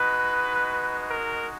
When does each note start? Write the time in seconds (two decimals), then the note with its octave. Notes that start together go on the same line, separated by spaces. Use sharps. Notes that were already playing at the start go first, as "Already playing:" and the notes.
Already playing: G#3 D#4 F#4 B4
1.09 A#4